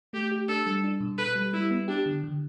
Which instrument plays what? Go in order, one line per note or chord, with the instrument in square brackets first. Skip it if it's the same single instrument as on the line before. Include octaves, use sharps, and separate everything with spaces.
[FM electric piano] A3 [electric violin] G4
[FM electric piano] G4
[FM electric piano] D4 [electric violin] A4
[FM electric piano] G3
D4
B2
[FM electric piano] A4 [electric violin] B4
[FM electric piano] G3
[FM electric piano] G3 [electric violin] E4
[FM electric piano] B3
[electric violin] D4 [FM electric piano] G4
[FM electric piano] D3
D3